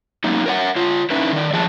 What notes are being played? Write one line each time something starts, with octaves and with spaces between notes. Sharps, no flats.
F#3 A#3 C#4 D#4
A#4 C#5 F#5
F4 C#5
C#4 D#4 E4 B4
D#3 D5
F3 G#4 C#5 A5